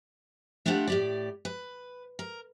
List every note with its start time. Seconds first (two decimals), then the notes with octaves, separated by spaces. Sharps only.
0.66 A3 D4 E4 F4 G4 F#5
0.87 A2 G4 D5
1.45 B4
2.19 A#4